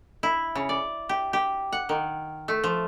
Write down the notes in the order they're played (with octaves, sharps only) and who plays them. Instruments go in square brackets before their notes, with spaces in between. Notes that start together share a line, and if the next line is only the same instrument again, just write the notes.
[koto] E4
C#3
D5
G4
G4
F#5
D#3
A3
F3